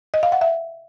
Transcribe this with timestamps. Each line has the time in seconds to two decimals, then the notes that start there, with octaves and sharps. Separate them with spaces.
0.14 D#5
0.23 F5
0.32 F#5
0.41 E5